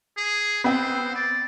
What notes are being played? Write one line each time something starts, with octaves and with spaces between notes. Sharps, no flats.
G#4
B3 C4 C5
D5